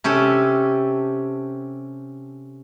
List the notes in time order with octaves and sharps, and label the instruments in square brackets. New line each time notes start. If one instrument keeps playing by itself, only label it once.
[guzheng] C3 C#4 G4 A4